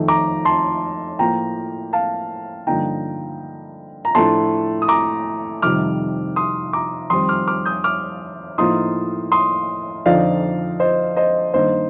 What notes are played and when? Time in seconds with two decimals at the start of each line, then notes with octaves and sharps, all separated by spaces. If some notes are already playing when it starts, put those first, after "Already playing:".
Already playing: F2 D#3 A3
0.08 A#5 D6
0.45 A5 C6
1.19 A2 F3 A#3 G5 A#5
1.93 F5 A5
2.67 G2 D3 F3 A#3 D#4 G5 A#5
4.05 A#5
4.14 A2 F3 A3 D4 A5 C6
4.82 D#6
4.88 A#5 D6
5.62 F2 C3 D#3 G3 D6 F6
6.36 C6 D#6
6.73 A#5 D6
7.10 F2 D#3 G3 C4 C6 D#6
7.29 D6 F6
7.47 D6 F6
7.65 D#6 G6
7.84 D6 F6
8.58 A2 F3 A#3 D#4 C6 D#6
9.32 C6 D#6
10.06 F2 D3 F3 C4 D#4 D5 F5
10.80 C5 D#5
11.16 C5 D#5
11.54 G2 D#3 A#3 D#4 C5 D#5